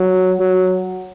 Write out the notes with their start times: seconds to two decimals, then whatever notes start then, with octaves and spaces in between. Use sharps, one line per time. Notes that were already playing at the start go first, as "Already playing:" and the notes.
Already playing: F#3
0.40 F#3